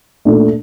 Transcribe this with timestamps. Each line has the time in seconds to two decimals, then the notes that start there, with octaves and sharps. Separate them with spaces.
0.25 A#2 A3 D4